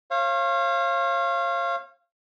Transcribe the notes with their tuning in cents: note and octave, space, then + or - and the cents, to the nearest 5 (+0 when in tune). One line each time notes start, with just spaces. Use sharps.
C#5 -45 F5 -20